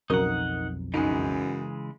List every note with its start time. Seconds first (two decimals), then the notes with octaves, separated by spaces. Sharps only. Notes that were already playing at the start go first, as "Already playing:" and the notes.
0.10 B1 F2 C#3 F#3 D#4 A#4 F#5
0.94 F#2 C#3 E3 G#3 D#4